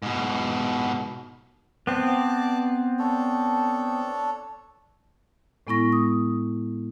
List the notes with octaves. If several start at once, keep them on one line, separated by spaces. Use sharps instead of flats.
G#2 B2
B3 C4 D5 A5 D6
D4 A4 C#5
A2 G#3 B3 E4 C#6 A#6
D#6